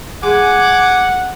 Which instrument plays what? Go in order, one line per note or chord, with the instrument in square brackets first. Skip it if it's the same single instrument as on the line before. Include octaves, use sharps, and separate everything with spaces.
[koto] G#3 A#3 [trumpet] F#5 [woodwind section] G#5 [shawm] D6